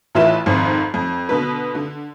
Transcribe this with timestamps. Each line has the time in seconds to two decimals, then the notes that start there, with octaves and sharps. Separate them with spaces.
0.15 A1 E3 A3 F4 B4 E7
0.46 G#1 F2 G#2
0.94 F2
1.29 B2 D3 B4
1.75 D3